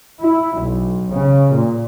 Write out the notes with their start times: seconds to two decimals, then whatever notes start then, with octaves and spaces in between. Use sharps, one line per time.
0.21 E4
0.60 B1
1.11 C#3
1.55 A#2